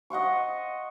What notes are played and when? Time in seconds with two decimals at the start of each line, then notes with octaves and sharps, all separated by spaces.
0.10 D#5 F#5 C6 C#6